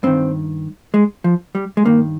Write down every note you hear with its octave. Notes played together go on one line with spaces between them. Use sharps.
G2 D#3 C4
G#3
F3
G3
G#3
G2 D#3 A#3